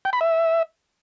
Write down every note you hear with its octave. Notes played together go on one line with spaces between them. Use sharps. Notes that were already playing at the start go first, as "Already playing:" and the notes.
G5
B5
E5